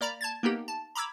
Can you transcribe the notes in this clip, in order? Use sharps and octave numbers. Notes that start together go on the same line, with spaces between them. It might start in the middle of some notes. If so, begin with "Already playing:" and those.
A#3 D5 A#5 B5
A5 G#6 A6
A#3 B3 D#4 G4
A5
A#5 B5 D6 E6 G#6